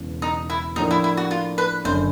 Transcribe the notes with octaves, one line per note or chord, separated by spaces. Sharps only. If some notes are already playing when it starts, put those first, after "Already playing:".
Already playing: E1 E2 C#3 E3
D#4
E4
A2 F3 A#3 D4 D#4
E4
E4
F#4
F4
B4
F#1 F#2 D3 C5